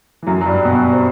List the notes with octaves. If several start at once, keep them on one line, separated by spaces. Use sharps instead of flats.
E3
F#2 F#3
F#3
G2 G3
B2 B3
C4